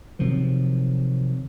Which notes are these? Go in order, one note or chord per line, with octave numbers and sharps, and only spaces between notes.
C3 D#3 F3 F#3